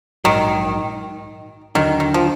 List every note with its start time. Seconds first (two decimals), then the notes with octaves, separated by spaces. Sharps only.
0.24 A#1 G#2 D#3 F#3
1.75 D#2 D3 D#3 F#3 D4
2.00 D#3
2.14 F3